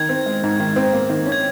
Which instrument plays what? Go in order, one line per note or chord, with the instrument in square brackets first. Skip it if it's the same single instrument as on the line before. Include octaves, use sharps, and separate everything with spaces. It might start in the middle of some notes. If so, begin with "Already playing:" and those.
Already playing: [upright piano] D#3 D#4 [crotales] G#6
[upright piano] C4
G#3
G#2
D#3
C4
A#3
D#3
C#4
[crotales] G#6